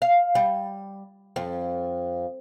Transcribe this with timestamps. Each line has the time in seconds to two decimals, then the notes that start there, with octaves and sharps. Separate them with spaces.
0.02 F5
0.35 G3
1.36 F2